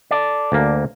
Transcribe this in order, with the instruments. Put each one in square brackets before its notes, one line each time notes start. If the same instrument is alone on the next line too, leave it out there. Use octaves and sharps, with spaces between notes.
[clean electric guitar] A4 D5
[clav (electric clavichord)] D2 A#3